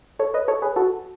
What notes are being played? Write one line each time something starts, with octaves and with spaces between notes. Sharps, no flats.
A4 C#5
B4 D#5
A4 C#5
G#4 B4
F#4 A4